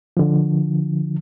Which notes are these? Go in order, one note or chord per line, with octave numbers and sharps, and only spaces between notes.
D3 F3